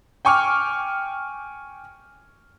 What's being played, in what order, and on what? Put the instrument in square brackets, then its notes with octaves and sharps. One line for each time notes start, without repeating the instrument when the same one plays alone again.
[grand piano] G5 G#5 C#6 D6 F6